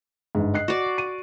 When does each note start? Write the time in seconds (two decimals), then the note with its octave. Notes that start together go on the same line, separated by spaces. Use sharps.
0.35 G1 G#2
0.54 D#5 F#6 C7
0.68 F#4 D5
0.98 D#7